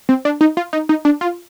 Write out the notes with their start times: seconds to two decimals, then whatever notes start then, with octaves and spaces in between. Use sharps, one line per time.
0.09 C4
0.25 D4
0.41 D#4
0.57 F4
0.73 D#4
0.89 D#4
1.05 D4
1.21 F4